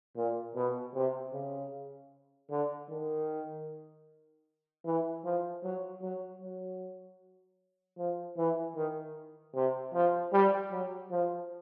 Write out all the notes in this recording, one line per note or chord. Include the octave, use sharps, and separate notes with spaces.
A#2
B2
C3
C#3
D3
D#3
E3
F3
F#3
F#3
F#3
F3
E3
D#3
C3
F3
G3
F#3
F3